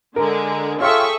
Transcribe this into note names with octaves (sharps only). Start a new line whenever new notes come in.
D3 G#3 A#4
F4 G#4 A4 C#5 E5 G5 C#6